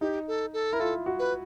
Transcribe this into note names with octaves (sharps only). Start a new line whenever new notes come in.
D#4 G4
A4
A4
E4 A#4
F4 A4
F#4
B4